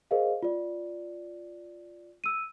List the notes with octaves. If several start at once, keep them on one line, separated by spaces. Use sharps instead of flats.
G#4 A#4 C5 D#5 F5
F4 D5
E6 D#7